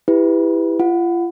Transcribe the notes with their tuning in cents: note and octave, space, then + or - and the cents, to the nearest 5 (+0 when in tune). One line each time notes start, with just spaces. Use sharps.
E4 +0 G4 +20 B4 +10
F4 -35 F#5 +0